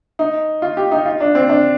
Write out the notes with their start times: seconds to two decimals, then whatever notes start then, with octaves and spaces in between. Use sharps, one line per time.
0.19 D#4
0.62 F4
0.77 G4
0.92 D#4
1.05 F4
1.20 D4
1.35 C4
1.49 D4